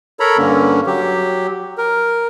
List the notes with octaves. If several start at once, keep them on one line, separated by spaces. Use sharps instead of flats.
A4 A#4 C#5 A#5 B5
G2 D3 A#3 C#4
F#3 G4
A#4